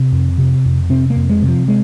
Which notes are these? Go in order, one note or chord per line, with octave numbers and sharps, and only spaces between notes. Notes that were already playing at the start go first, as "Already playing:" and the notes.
Already playing: C3 C4
F2
C3
F2
C3 C4
A#3
F2
G#3
C3
F3
G#3